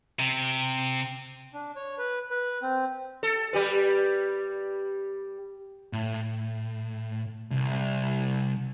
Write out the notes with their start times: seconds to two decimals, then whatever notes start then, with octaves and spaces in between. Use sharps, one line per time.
0.19 C3
1.53 D4
1.76 C#5
1.98 B4
2.31 B4
2.62 C4
3.23 A4
3.53 G3 G4 B4
5.93 A2
7.51 C2